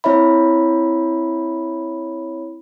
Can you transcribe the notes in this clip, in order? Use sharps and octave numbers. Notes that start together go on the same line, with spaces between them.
C4 E4 C#5 E5 B5